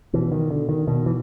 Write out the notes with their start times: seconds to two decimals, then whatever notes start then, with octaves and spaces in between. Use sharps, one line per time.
0.13 B2 E3
0.32 D#3
0.51 D3
0.69 D#3
0.87 B2 D#3
1.06 E3